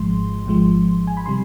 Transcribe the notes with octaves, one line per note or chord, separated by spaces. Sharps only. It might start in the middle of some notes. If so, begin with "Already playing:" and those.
Already playing: G#1 G#2 F3 G#3 C6
G#1 G#2 F3 G#3
G#5
B5
C3 G3 C6